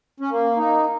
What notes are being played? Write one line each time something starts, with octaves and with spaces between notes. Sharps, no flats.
C#4
A#3
D#4